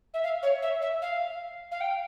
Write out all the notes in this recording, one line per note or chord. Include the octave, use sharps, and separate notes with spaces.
E5
F5
C#5
E5
E5
F5
F5
G5